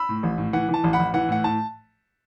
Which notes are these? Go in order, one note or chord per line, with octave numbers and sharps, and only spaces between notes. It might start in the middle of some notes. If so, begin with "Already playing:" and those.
Already playing: B5 E6
A2
A1
A2
E3 F#5
E3
A5
A1
F#5 B5
A1
E3 F#5
A2 F#5
A2 A5